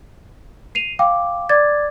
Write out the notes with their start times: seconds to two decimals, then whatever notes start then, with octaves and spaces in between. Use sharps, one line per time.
0.75 C7 D#7 F7
0.99 F5 G5 D6
1.49 D5 D6 G#6 A6